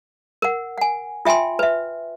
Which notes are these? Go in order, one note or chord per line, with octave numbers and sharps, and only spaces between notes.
A#4 F#5
F#5 G#5
F4 E5 G5 G#5 C6
B4 E5